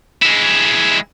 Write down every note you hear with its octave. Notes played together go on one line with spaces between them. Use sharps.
G#3 E4